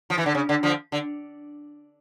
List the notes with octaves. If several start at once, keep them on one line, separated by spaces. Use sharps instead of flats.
F3
E3
D3
C#3
D3
D3 F3
D3